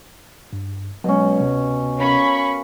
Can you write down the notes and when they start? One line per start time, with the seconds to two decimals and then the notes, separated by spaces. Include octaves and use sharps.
0.53 G2
1.04 B2 F#3 G#3 C#4
1.40 D2 C3
2.00 C#4 A#4 F5 B5 C#6